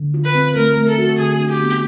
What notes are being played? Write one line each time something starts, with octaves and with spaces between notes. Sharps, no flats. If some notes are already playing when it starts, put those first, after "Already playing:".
Already playing: D3
F4
B4
C4
A3 A#4
A3
A4
F#4
D3 G#4
D4
G4
B3